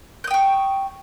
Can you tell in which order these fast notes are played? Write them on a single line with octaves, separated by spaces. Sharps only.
G6 D#6 G5 C#6